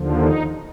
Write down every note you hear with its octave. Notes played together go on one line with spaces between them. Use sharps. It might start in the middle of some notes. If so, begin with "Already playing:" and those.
Already playing: D#2 D3 F3
D#4